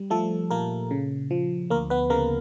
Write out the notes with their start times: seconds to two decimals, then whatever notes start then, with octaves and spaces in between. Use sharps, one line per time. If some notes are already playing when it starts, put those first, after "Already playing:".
Already playing: G3
0.10 F3 A3 A4
0.51 A#2 A#3 A#4
0.91 C#3
1.31 F3
1.70 D2 A#3 A#4
1.90 B3 B4
2.10 C#3 A#3 A#4